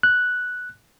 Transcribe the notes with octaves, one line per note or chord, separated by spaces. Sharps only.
F#6